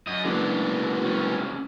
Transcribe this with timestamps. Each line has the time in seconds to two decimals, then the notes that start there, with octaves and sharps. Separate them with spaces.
0.07 F#2 D#5
0.25 F#1 F#3 G#3 B3 D4
1.04 C2 C#4